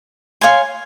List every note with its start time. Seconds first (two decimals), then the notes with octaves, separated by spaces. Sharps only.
0.41 C#5 F5 G#5 C6